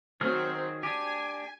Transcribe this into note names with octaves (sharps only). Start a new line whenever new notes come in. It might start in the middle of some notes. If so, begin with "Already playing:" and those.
D#3 F#3 C4 G#4 F6
D4 G4 G#5